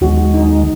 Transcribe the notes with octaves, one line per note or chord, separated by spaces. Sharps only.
D#2 D#3 G#3 F#4
D#4